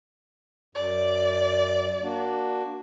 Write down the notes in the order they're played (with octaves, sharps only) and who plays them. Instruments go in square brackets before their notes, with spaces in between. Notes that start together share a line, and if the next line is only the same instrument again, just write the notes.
[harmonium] F#2 [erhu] D5
[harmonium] A#3 D4 F#4